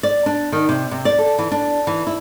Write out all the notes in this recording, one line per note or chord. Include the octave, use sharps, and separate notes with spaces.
D5
D4
D#3
C3
C3
D5
A4
E3
D4
E3
E4